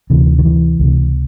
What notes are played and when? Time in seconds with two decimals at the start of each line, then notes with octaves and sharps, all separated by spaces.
0.10 D2 C3 E3
0.39 D#3
0.45 E3
0.79 C#2 C3